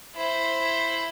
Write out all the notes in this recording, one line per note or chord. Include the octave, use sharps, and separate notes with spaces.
E4 C5